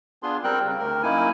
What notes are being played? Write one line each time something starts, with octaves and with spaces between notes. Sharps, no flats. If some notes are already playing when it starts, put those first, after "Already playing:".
B3 D4 F4 G#4 C6
G3 C4 A#4 G5 F#6
C#3
D2 A#4
F#2 A#3 D#4 E4 G#5